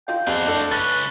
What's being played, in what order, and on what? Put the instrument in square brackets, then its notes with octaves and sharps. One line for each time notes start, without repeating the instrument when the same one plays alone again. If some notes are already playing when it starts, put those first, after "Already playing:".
[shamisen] D#3 F4 F5 [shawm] G5
[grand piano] F2 [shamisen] B3 G#4 F5 [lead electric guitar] F#4 D5 [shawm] C5
[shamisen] A3 E4 [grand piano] D4 A4
[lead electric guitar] C#2 C#4 [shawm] B4 [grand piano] A6 A#6